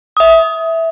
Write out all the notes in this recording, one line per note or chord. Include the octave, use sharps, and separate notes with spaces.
E5 D#6